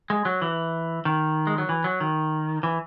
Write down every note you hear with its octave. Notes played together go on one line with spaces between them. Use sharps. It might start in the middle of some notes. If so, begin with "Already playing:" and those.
G#3
F#3
E3
D#3
G#3
F#3
E3
F#3
D#3
E3